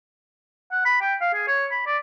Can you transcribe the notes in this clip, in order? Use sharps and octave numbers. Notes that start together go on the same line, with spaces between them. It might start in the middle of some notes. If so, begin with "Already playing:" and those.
F#5
B5
G5
F5
G#4
C#5
B5
D5